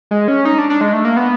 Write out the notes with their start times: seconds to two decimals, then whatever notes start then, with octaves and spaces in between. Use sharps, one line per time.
0.11 G#3
0.28 C#4
0.45 D#4
0.58 D4
0.70 D4
0.81 G#3
0.93 A3
1.05 A#3
1.17 B3